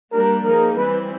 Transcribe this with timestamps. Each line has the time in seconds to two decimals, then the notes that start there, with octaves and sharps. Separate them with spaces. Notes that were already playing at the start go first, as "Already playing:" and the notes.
0.12 G3 A#3 D4 A#4
0.44 F3 A#3 D#4 G#4 A#4
0.76 E3 G3 C4 E4 B4